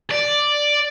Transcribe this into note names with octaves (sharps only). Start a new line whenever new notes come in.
D5